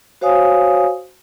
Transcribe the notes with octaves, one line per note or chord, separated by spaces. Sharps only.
F#4 C5 C#5 F5 G#5 D#6